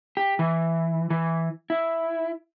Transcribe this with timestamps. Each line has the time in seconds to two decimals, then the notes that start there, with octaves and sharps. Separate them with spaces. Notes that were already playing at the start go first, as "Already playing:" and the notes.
0.17 G4
0.39 E3
1.10 E3
1.70 E4